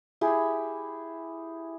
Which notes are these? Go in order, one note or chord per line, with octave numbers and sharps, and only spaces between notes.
E4 G4 G#4